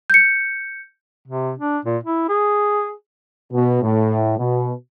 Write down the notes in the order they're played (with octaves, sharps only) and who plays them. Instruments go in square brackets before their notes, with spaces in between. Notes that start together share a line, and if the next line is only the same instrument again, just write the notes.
[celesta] G6 C#7
[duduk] C3
D4
A#2
E4
G#4
[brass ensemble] B2
A2
B2